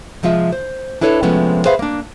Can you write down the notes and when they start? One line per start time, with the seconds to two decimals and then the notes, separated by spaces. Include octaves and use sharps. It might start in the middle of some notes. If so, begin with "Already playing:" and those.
0.23 C3 F3 G#3 F4 E5
0.52 C5
1.01 D4 E4 A4 B4 C#5
1.23 C3 F3 G#3 A3 B3 C#4
1.65 G#4 B4 C5 E5 F5
1.79 A#3 D4